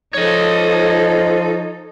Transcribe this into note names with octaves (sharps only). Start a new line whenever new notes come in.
F3 D#4 A4 C#5 D#5